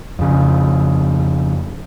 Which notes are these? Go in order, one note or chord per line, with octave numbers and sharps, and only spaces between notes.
F2 C#3